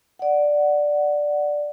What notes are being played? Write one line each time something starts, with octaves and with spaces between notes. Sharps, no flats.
D5 F#5